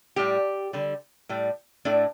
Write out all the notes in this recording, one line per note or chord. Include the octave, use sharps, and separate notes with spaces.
A2 G3 G4
D3 G3
A2 G3
A2 A3 D4